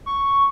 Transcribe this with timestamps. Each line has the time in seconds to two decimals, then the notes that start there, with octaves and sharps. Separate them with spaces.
0.06 C#6